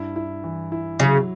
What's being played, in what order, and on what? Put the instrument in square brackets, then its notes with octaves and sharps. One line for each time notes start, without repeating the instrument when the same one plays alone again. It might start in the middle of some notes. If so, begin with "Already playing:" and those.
Already playing: [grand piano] G2 E4
E4
E3
E4
[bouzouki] C#3 [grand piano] F#3